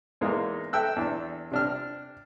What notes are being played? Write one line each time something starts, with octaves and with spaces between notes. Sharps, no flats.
E2 G#3 A#3 D#4
A4 E5 G5 E6 F#6
E2 D4
C3 D4 F6